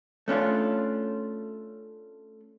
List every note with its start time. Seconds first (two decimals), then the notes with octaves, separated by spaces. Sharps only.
0.28 A3 C#4 D4 F4